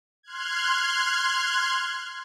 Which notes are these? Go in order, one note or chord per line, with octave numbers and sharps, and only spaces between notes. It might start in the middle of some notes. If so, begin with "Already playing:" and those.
C6 F6 F#6 G#6